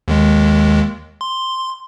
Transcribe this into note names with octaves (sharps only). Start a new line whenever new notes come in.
D#2 D#3 G#3
C6